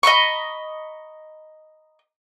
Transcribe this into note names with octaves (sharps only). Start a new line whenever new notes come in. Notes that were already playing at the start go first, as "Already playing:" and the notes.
D#5 A#5 B5 C#6